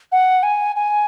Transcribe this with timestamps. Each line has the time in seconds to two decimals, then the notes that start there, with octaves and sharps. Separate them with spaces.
0.12 F#5
0.43 G#5
0.76 G#5